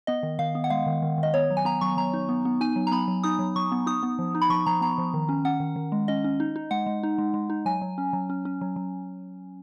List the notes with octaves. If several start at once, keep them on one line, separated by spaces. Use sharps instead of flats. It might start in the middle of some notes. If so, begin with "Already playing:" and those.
B3 D#5
D#3
D#3 F5
B3
F#5
G#3 F5
D#3
D#3
D#3
D#5
B3 C#5
F#3
G#5
B3 A#5
F#3 C#6
F#3 A#5
D#4
B3
B3
D#4 G#5
F#3
A#5
B3 B5
F#3
D#4 D#6
F#3
F#3 C#6
B3
D#4 D#6
B3
F3
D#4
B5
F3 C#6
F3 A#5
B3 A#5
F3
D#3
C#4
C#4 F#5
D#3
D#3
G#3
C#4 D#5
C#4
D#4
D#4
G#3 F#5
G#3
D#4
G#3
G#3
D#4
F#3 G#5
F#3
C#4
F#3
C#4
C#4
F#3
F#3